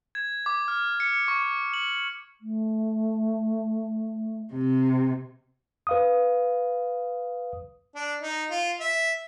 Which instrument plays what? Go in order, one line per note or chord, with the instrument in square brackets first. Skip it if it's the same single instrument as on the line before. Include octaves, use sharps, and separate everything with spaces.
[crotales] G#6
D6
F6
C#7
C#6
F#7
[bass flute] A3
[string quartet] C3
[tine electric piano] B4 F5 D#6
[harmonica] D4
D#4
F4
E5